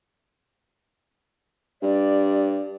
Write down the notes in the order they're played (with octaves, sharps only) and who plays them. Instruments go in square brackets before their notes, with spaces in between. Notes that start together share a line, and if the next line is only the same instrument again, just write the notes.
[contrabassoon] G2 [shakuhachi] D5